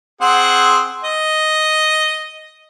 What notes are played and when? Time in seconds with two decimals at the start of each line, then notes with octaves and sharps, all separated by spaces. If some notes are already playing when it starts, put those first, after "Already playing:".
0.21 C4 G#4 F#5
1.04 D#5